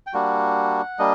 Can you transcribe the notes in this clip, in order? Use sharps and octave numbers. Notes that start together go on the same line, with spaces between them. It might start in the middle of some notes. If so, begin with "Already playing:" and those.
G5
G3 A#3 D4 F#4 F#5
G3 A#3 D4 D#5